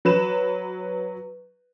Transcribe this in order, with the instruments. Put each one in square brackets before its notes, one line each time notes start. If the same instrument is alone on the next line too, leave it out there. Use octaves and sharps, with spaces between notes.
[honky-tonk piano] F#3 B4 E7